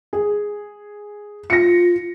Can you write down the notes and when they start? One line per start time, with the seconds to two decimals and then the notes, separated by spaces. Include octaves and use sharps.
0.13 G#4
1.50 F4 A#6 C#7